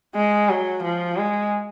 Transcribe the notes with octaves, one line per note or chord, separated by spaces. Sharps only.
G#3
F#3
F3
G#3